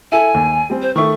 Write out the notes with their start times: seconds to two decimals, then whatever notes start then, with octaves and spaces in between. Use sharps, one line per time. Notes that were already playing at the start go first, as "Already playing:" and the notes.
0.12 E4 A4 G#5
0.34 D#2
0.70 G3 C4
0.82 C5
0.96 D#3 A3 C#6